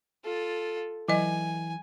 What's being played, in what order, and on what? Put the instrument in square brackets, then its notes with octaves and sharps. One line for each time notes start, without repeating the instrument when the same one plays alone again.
[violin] F4 A4
[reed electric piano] E3 [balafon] F#3 D#5 [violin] G#5